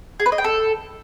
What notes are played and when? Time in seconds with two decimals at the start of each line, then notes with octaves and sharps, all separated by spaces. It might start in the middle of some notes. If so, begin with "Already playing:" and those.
0.20 G#4
0.26 B4
0.32 D#5
0.38 G5
0.44 A4